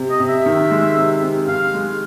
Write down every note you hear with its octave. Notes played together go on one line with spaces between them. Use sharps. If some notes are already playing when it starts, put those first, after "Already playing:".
Already playing: C3
D#5
C3
E5
D#3
G#3
C3
C3
D#3 F5
G#3